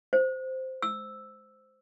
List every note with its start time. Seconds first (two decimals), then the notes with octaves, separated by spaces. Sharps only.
0.13 C5
0.82 E6